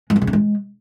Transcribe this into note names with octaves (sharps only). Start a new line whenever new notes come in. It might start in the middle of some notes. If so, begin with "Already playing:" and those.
G#3
F3
C#3
D4
G#3